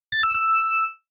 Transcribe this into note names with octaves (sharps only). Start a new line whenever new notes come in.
A6
E6
E6